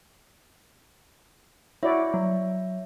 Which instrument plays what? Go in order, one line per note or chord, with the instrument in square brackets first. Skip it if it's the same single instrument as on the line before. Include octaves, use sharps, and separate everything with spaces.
[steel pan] E4 F#4 D5 [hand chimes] C#5 E5
[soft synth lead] F#3